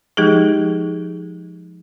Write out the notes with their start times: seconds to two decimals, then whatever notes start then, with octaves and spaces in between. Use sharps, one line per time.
0.17 F3 G#3 D#4 G4 G#4